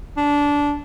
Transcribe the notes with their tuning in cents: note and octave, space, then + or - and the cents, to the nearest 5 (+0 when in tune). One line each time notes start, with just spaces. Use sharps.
D4 -15